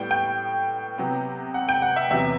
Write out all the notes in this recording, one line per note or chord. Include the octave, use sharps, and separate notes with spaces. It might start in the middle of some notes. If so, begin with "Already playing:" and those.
Already playing: A2 G3 B3 G5
G5
C3 F#3 B3
F#5
G5
F#5
E5
E2 C3 F#3 B3 E5